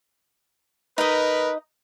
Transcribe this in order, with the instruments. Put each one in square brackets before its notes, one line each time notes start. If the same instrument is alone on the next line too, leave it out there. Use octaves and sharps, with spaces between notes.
[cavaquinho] D#4 D#5 [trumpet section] A#4 B4